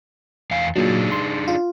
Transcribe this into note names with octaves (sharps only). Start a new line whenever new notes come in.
E2 F5 G#5
A#2 F#3 D4 D#4 G#4
C6
F4